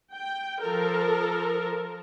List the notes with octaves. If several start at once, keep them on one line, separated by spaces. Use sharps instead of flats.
G5
F3 A4 A#4